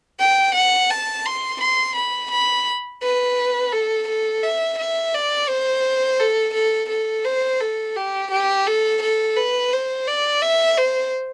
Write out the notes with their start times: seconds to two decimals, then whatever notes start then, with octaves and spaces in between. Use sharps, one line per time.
0.19 G5
0.55 F#5
0.90 A5
1.25 C6
1.61 C6
1.96 B5
2.31 B5
3.02 B4
3.72 A4
4.08 A4
4.43 E5
4.78 E5
5.14 D5
5.48 C5
6.20 A4
6.54 A4
6.89 A4
7.25 C5
7.60 A4
7.96 G4
8.31 G4
8.67 A4
9.02 A4
9.36 B4
9.72 C5
10.07 D5
10.42 E5
10.78 C5